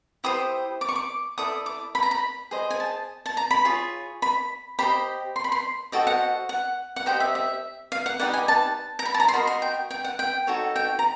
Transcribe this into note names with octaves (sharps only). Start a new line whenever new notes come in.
E4 G4 C5 D#6
D6
C#6
D6
E4 A4 D5 D#6
D6
B5
A#5
B5
G#4 C5 D#5
G#5
A5
A5
A#5
B5
F4 G#4 C#5
B5
G4 C5 D#5 B5
C6
B5
C6
F#4 A4 C5 D#5 G5
F#5
F#5
F#5
G4 C5 D#5 G5
E5
E5
F5
F#5
D#4 G4 B4 D5 F#5
G#5
A5
A#5
B5
A5
A#5
C6
F#4 A#4 D#5 B5
C6
G5
G5
F#5
G5
D#4 F#4 A4 C#5
G5
A#5